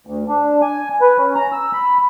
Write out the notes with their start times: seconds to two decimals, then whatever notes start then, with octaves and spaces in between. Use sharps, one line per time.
0.07 D2
0.28 D4
0.62 G#5
1.01 B4
1.18 C#4
1.35 A#5
1.52 E6
1.73 B5